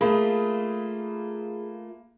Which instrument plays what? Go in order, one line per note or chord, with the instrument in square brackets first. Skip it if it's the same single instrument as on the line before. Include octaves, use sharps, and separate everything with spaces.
[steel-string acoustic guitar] A3 F4 [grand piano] A#3 B5 [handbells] G#4